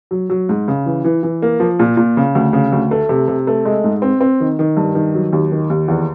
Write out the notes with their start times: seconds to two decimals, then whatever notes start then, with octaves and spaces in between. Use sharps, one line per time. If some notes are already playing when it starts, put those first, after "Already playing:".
0.11 F#3
0.30 F#3
0.49 G#2
0.68 C#3
0.86 E3
1.04 E3
1.23 E3
1.42 A#3
1.60 F3
1.79 A#2
1.97 A#2
2.17 C#3
2.35 D2
2.53 C#3
2.72 D2
2.91 A3
3.09 C3
3.28 C3
3.47 A3
3.65 G#3
3.84 G#2
4.02 C4
4.21 C4
4.40 D#3
4.59 D#3
4.77 G2
4.95 D#3
5.14 F#3
5.33 D#2
5.52 D#3
5.70 D#2
5.88 E2